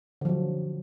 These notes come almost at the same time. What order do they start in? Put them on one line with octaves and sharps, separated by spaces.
D3 F3 F#3